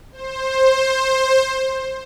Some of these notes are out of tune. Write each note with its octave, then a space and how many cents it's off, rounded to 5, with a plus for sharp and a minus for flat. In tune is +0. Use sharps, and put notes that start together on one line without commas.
C5 +15